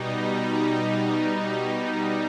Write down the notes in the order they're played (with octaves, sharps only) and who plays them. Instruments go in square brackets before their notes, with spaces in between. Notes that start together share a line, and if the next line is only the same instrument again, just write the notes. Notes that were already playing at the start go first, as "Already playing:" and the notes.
Already playing: [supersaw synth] B2 G3 D#4